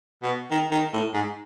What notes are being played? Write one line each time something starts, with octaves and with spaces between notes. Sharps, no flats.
B2
D#3
D#3
A2
G#2